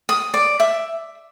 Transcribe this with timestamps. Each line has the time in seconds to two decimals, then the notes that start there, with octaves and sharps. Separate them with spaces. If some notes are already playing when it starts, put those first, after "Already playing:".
0.09 D#6
0.34 D5
0.60 E5